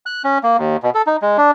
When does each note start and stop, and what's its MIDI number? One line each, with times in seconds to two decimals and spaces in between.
0.06 0.22 90
0.24 0.38 61
0.43 0.57 58
0.58 0.77 39
0.83 0.90 47
0.95 1.02 69
1.07 1.16 63
1.22 1.37 56
1.38 1.51 62